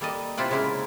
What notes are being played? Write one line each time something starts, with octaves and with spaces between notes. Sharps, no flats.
G3 A#3 A4 D5 D#5
C3 E4 F4 D5 F#5
C#3 G#3 A#3 E4 A#4